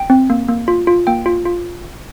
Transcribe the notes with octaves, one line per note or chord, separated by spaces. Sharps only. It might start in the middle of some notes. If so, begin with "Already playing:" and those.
Already playing: G5
C4
A#3
A#3
F4
F4
A#3 G5
F4
F4